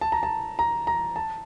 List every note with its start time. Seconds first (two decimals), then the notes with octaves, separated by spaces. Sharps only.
0.01 A5
0.12 A#5
0.23 A5
0.59 A#5
0.87 A#5
1.16 A5